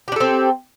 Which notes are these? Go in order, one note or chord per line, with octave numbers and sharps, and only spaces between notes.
C4 D4 G4 A4